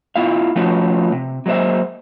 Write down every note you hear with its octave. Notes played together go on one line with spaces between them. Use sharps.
B3 E4 F4 E5 F5
F3 A3 B3 C#4 F4 F#4
C3
F#3 G#3 A#3 C5 E5